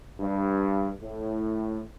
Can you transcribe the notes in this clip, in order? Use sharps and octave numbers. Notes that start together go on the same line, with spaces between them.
G2
A2